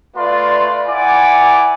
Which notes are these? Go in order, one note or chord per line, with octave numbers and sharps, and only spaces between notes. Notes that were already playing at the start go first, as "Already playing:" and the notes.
A3 F4 B4 D5 C6
E4 D5 F#5 G#5 D6